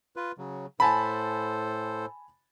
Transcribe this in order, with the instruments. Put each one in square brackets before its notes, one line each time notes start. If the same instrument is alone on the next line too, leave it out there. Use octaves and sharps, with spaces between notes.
[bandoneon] F4 B4
C#3 F#3
[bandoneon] A2 A4 C5 [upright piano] G#5 A5 B5